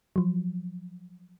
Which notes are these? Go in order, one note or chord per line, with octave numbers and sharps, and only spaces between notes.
F3 F#3